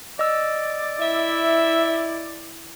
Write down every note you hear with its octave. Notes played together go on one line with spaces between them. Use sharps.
D5 D#5 E6
E4 E5